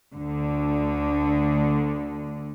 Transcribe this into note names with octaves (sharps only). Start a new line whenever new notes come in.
D2 D3